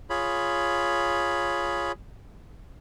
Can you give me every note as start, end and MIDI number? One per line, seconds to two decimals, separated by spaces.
0.10 1.92 65
0.10 1.92 68
0.10 1.92 73
0.10 1.92 83